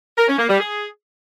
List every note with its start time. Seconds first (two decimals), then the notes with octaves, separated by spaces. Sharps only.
0.18 A#4
0.28 C#4
0.38 A#3
0.49 G3
0.59 G#4